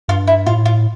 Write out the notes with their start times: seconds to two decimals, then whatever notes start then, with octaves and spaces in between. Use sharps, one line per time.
0.09 G2 F4
0.27 E4
0.46 A2 F4
0.66 F4